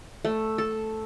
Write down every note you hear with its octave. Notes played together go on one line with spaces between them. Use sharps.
A3
A4